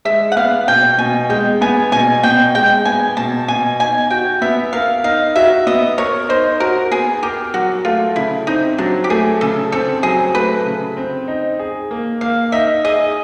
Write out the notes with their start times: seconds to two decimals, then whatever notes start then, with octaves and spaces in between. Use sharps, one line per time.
0.05 G#3 E5
0.32 F#5
0.36 B3 F5
0.67 B2 G5
0.98 B2 G#5
1.30 G#3 G5
1.61 B3 G#5
1.92 B2 G#5
2.23 B2 G5
2.55 G#3 G5
2.85 B3 G#5
3.17 B2 A5
3.48 B2 G#5
3.80 D#4 G#5
4.11 F#4 G5
4.42 B3 E5
4.73 A#4 F5
5.04 D#4 F5
5.36 F#4 E5
5.67 B3 D#5
5.98 A#4 C#5
6.29 D#4 C5
6.60 F#4 A#4
6.91 B3 G#4
7.23 G4 A#4
7.54 F#3 F#4
7.85 A3 F4
8.16 C#3 E4
8.47 C4 D#4
8.78 F#3 D4
9.04 G4
9.10 A3 G#4
9.41 C#3 A4
9.72 C4 A4
10.03 F#3 G#4
10.34 A3 B4
10.66 C#3
10.97 C4
11.28 D#4
11.59 G#4
11.91 A#3
12.21 A#3 F5
12.52 D#4 E5
12.84 G#4 D#5